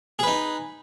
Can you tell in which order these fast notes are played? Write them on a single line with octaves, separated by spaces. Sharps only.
G#4 B4 D#4